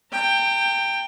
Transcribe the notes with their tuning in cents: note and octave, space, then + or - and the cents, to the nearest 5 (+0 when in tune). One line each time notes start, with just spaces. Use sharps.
G5 +10 A#5 -40